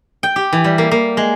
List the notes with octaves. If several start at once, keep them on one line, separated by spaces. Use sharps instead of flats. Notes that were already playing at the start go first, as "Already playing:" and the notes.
G5
G4
E3
G3
A#3
A#3
G#3